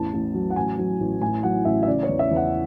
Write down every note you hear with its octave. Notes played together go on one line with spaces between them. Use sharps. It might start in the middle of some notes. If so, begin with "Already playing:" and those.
Already playing: A1 E2 A5
A1
F#3
F#5
A1 G#5
F#3
A1
A2 G#5
F#3 F#5
A1 E5
E5
C#3 D5
C#5
E2
E5
E2
F#5